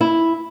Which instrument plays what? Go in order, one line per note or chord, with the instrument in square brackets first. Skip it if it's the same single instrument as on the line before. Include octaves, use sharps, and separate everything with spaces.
[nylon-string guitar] E4